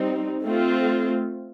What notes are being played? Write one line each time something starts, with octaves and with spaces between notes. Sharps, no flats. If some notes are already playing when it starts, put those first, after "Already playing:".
Already playing: G3 C4 D#4
A3 C4 F4